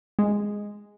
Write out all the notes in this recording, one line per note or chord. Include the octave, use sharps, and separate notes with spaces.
G#3